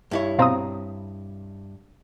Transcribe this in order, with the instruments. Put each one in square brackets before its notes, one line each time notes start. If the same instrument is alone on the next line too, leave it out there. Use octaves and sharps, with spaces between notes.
[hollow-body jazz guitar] G2 E4 C#5
[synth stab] B2 C4 [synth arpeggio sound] F5 A#5 D#6